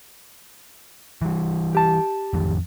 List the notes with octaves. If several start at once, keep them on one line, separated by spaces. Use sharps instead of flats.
E3 G3
G4 A5
A1 F2 D#3